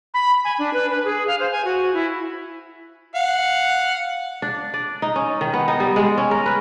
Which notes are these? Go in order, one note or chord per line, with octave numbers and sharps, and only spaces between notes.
B5
G#5
D4
B4
B4
G#4
F5
C5
G#5
F#4
E4
F5 F#5
D4
D5
D#4
C#4
D#3
B3
D#4
G3
G#3
C#4
A#4
B4